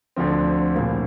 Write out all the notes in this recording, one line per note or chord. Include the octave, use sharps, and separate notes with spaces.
D2 D3 F3 C4
A#1 A2 F3 A#3